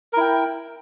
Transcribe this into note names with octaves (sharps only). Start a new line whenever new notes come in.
E4 A#4 G5